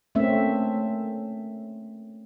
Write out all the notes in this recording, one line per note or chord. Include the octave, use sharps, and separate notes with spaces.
A3 A#3 C4 C#4 E5